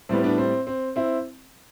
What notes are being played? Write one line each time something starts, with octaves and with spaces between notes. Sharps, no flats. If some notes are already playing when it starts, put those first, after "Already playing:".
A2 G3 B3 C4
B3 D4
C4
C4
C4 E4